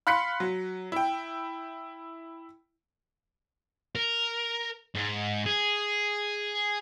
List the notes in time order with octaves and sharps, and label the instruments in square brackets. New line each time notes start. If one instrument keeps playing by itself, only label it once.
[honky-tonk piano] F5 B5 C6 F#6 B6 C#7
F#3
E4 G5
[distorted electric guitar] A#4
G#2
G#4